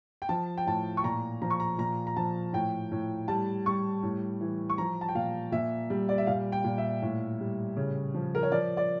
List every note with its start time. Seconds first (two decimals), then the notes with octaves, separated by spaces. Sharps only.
0.22 G5
0.29 F3 A5
0.57 G5
0.66 A2 A5
0.97 C#6
1.04 A#2 A#5
1.42 F3 A#5
1.50 C#6
1.60 A#5
1.78 A#2 A#5
2.07 A#5
2.16 F3 A5
2.53 A2 G5
2.92 A2
3.28 G3 A5
3.66 G3 C#6
4.03 A2
4.41 E3
4.70 C#6
4.78 F3 A#5
5.01 A5
5.09 G5
5.15 A#2 F5
5.52 A#2 E5
5.90 G3
6.09 D5
6.18 E5
6.27 A#2 F5
6.52 G5
6.64 A#2
6.78 E5
7.02 A2
7.40 G3
7.77 C#3
8.14 F3
8.35 A#4
8.43 C#5
8.52 F3 D5
8.77 D5